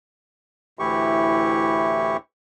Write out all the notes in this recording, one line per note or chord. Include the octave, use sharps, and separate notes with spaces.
D2 A2 E3 E4 G4 C#6